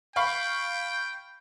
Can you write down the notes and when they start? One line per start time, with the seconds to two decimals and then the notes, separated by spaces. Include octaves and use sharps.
0.16 F5 G5 B5 C#6